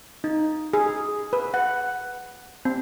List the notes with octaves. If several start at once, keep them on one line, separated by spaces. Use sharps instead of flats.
D#4
G#4
B4
F#5
C4